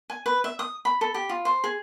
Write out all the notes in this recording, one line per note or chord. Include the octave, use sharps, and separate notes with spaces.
G#5
B4
E5
D#6
B5
A4
G4
F4
C5
G#4